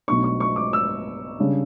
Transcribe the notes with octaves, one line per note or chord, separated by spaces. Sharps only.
B1 B2 A3 D4 C#6
C#6
C#6
D6
E6
C#3 G3 D4